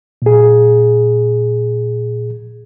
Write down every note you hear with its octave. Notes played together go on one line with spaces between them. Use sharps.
A#2 G#4